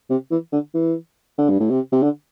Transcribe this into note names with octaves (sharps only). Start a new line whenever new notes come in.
C3
E3
D3
E3
D3
G2
A2
C3
C3
D3